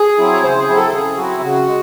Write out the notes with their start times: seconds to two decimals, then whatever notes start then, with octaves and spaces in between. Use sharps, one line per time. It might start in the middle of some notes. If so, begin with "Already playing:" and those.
Already playing: G#4
0.18 F#3 C4 E4
0.32 C#5
0.43 C#3 C5
0.59 G#4
0.68 F#3 C4 E4
0.76 A4
0.92 C#3 G#4
1.17 F#3 C4 E4 F#4
1.42 C#3 F#4
1.67 G#3